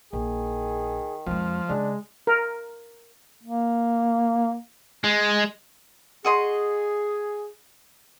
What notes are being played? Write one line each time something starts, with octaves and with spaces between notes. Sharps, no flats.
A#1 D#3 G#4
F2 F3 G#3
C#3 G#3 D4
A#4
A#3
G#3
F#4 G#4 D#5 C6